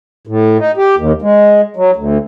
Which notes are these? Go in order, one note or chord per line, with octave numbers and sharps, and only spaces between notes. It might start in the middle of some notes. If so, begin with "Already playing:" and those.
A2
D#4
G4
D#2
G#3
F#3
D2